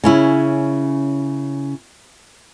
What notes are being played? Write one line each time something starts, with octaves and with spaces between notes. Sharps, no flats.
C#3 C#4 E4